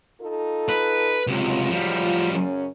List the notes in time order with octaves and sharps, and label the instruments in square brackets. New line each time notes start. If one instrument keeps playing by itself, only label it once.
[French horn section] D#4 F4 A4
[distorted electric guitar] B4
[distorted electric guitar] C#2 C3 [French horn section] F#3 G#3 F4
[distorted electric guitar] F3 G3
[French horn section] F#2 C#3 C#4